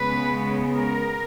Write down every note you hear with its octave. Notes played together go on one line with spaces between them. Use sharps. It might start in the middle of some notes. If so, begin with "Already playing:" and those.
Already playing: C#3 G#3 B3 B4
A#4